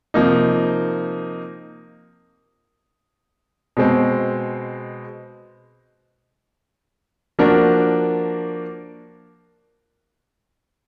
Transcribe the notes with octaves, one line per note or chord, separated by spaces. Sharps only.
C3 F3 A#3 D#4
B2 G#3 C4
F3 A#3 D4 F#4 A#4